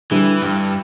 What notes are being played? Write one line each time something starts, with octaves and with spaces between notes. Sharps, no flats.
D3 E3 G3 D4
G2